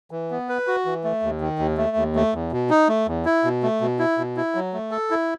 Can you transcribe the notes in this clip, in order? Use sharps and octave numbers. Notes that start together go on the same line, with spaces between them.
E3
B3
B4
F#4
E3
A3
D#2
D#3
D#2
A3
D#2
A3
E2
B2
D#4
A3
E2
E4
B2
A3
B2
E4
B2
E4
F#3
A3
A4
E4